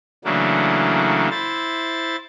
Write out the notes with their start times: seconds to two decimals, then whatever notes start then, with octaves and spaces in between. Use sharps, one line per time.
0.25 C#3 E3 F#3 A3 A#3 D4
1.31 E4 C5 A6